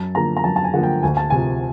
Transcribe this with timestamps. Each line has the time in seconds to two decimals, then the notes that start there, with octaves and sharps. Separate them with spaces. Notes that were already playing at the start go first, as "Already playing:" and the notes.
Already playing: F#2 A5
0.15 D3 F3 A#3 A#5
0.37 A#5
0.44 F#2 A5
0.56 A5
0.64 G#5
0.73 D3 F3 A#3 F#5
0.83 G5
1.03 D2 G#5
1.17 A5
1.30 C3 F3 G#5